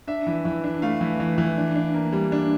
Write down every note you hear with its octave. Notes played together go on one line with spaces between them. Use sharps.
D4 E5
E3
E3
D4
A3 F5
E3
E3
E3
D4
D4
A#3
G3
D4